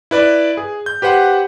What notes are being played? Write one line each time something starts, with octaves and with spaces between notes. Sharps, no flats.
E4 B4 D5
G#4
G6
G4 B4 C5 F#5